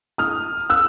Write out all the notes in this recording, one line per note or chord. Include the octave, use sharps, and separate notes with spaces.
D#6 F6
E6 F#6